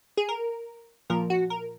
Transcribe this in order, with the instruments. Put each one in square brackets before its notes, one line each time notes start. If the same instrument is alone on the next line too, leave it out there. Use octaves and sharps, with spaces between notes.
[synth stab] G#4
A#4
A#2 F3 A#4
F#4
A#4